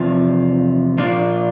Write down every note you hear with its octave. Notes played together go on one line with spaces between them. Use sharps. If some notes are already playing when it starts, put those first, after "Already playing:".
Already playing: E2 C3 F3
A#2 F3 A#3 D4 F4